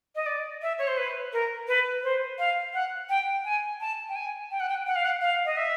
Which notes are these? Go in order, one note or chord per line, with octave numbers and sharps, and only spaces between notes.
D#5
D5
E5
C#5
C5
B4
A#4
B4
C5
F5
F#5
G5
G#5
A5
G5
G#5
G5
F#5
G5
F#5
F5
F#5
F5
D#5
E5